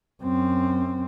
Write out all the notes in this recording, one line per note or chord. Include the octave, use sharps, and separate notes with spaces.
F#2 C4